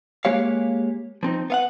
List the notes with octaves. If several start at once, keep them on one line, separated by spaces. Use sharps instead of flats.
G#3 A#3 G4 C#5 F5
F3 C4 D#4
B3 F5 F#5